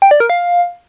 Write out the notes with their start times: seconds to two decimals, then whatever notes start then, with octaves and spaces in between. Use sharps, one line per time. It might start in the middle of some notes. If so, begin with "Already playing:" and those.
0.02 G5
0.11 D5
0.20 A#4
0.30 F5